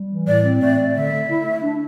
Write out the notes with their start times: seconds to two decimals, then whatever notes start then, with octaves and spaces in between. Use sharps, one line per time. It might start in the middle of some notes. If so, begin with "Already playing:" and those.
Already playing: G3
0.11 E3
0.27 A2 D5
0.44 C4
0.61 A3 D5
0.78 A3
0.95 D3 E5
1.13 D3
1.29 E4
1.46 A3
1.62 D4